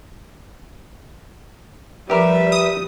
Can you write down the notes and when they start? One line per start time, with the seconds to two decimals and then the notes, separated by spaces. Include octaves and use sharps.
2.10 F3 G3 G4 A#4 B4 E5
2.52 D#6